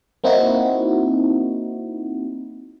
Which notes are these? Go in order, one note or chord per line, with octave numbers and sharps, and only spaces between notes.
A#3 C4 D#4 E4 F#4